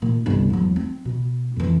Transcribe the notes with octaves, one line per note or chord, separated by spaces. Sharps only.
A#2 D#3
G1 C2
E2 F#3
C4
B2
F2 E3